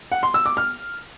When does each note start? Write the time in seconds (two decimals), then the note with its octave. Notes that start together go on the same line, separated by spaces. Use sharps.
0.12 F#5
0.23 C6
0.34 E6
0.46 D6
0.57 F6